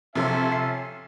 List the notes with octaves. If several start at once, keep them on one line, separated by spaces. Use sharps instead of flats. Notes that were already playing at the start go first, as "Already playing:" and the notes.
C3 F3 C#4 A4 E5 C6
C7